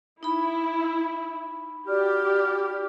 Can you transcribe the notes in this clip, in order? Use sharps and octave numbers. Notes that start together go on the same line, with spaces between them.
D#4 E4 B5
F#4 G4 D5 F6